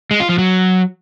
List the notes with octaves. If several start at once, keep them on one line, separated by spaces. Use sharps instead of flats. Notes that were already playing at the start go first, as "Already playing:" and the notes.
G#3
F4
F3
F#3